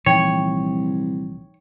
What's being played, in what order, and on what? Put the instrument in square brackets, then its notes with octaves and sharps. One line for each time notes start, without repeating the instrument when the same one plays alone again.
[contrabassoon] C2 [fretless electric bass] A#2 E3 F3 [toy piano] D#4 G5 [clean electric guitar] C#5